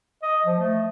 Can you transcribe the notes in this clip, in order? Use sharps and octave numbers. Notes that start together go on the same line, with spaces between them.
D#5
F3
A3